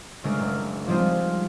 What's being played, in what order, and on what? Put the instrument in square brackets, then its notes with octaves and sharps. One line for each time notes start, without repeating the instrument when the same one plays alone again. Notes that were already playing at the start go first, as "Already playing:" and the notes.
[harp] C#3 G#3 A3 D4 A#4
F#1
F3 G3 G#3 C4 D#4 F4